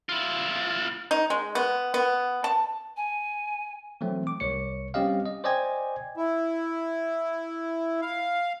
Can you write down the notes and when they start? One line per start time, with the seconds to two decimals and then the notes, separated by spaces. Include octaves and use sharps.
0.09 E4 F4
1.11 D#4
1.30 G#3
1.55 B3
1.94 B3
2.44 A5
2.97 G#5
4.01 E3 F#3 A3 C4
4.27 D6
4.40 C2 C#5 C#7
4.94 G3 C4 C#4 G4 D#5 F5
5.25 D#5
5.44 C5 D5 D#5 G5 G#5 G#6
6.17 E4
8.02 F5